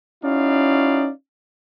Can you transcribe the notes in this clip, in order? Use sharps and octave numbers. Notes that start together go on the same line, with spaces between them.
C#4 D#4 E4 F#4 D5 F5